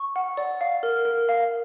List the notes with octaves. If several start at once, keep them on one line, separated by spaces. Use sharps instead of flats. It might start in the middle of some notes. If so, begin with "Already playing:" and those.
Already playing: C#6
F#5
D5
F5
A#4
A#4
F5